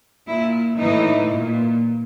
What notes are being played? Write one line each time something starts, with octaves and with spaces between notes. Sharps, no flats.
A#2 E4
A2 E3 D#4
A#2